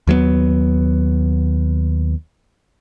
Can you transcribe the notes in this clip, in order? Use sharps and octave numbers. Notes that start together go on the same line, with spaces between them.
D#2 F#3 G#3 B3